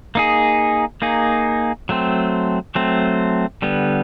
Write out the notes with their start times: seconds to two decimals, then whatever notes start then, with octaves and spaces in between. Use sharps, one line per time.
0.15 A#3 D#4 G#4
1.02 A#3 D#4 G#4
1.89 F#3 A3 C4
2.75 F#3 A3 C4
3.62 D3 G3 B3